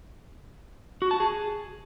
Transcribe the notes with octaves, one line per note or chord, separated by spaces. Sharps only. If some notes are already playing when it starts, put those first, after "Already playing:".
F#4
A5
G#4